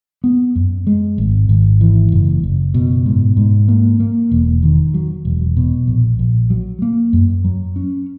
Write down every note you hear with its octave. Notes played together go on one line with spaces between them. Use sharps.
B3
F#2
G#3
G#1
G#1
E3
F#1
F#1
B2
G#2
G#2
A#3
A#3
E1
D#3
F#3
E1
B2
A#1
A#1
F#3
A#3
F#2
F#3
C#4